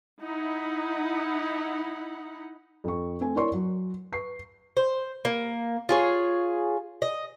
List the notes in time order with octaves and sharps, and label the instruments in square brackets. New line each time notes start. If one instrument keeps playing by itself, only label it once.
[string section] D#4 E4 F#5 B5
[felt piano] F2 C#6
A3 C4 G#5
E4 A#4 C#5 D5 C6 C#6
F#3
B4 C#6 C7
[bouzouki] C5
A#3
F4 G#4 C#5
D#5